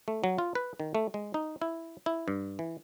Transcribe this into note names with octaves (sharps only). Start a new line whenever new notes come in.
A3
F#3
F4
B4
D#3
A3
G#3
D#4
E4
E4
G2
E3